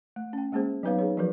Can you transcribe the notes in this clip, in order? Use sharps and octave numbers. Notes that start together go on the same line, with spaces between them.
A3
C#4 G5
G#3 A#3 C#4 G#4 C5
F#3 B3 D#4 B4 C#5 F5
D#4 G#4 C#5
F3 F#3 F#4 A#4 B4